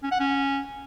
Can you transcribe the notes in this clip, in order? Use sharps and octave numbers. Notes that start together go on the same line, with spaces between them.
C#4
F#5
C#4